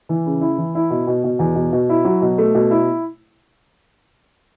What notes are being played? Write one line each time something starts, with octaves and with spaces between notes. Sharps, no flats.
E3
C#3
E4
E3
E4
B2
B2
B2
E2
B2
B2
E4
F#3
B2
A3
B2
E4